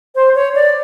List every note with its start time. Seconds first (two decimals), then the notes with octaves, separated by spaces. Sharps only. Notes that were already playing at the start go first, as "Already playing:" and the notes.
0.15 C5
0.35 C#5
0.55 D5